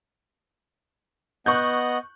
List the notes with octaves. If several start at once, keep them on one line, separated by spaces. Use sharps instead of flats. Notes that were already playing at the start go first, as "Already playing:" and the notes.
B3 D#5 F#5 C#6 F#6 G6